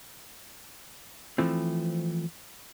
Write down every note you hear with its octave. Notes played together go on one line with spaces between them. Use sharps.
E3 F3 A3 C4